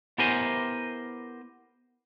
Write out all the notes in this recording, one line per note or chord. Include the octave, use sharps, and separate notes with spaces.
B3 E4 G4 A#4 C5 G#5